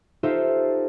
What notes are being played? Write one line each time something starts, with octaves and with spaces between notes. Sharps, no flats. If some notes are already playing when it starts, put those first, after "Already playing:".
D#4 F4 G4 A4 C5 E5